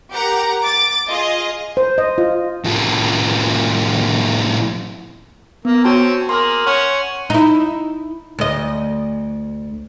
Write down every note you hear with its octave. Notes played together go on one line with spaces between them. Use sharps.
G4 A#4 F#5 A#5
D6 A6 D7
F4 G#4 D#5
C5
D#5
F4
A2 F3
A#3 B3
C4 C#4 F#4 G5 A5
A#3 G#4 A#4 C6
C#4 F#5
D#4 E4
D2 D#5